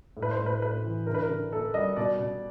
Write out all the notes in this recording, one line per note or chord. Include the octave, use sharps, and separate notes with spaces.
A2
B4
C5
A2
B4
A3 B4
E3
D3 A#4
B4
A#4
D3
A#3 A4
G3 D#5
B2 D5
B2